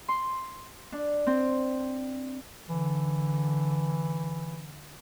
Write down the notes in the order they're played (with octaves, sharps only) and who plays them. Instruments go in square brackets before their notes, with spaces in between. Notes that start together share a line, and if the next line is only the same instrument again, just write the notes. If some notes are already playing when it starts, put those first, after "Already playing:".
[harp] C6
D4
C4
[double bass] D3 [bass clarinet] E3